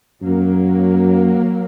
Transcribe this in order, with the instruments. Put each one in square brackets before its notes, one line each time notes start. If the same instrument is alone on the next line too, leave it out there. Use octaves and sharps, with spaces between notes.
[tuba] F#2 [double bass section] F#3 A#3